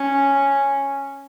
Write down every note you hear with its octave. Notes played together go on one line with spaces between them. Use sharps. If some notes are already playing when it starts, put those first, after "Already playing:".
Already playing: C#4